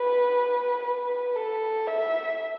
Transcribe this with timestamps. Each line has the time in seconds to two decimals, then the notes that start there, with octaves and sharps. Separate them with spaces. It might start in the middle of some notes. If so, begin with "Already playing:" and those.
Already playing: B4
0.84 B4
1.36 A4
1.87 E5